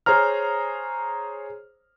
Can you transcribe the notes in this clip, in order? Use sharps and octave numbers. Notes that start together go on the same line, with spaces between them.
G#4 C5 C#5 A#5 F6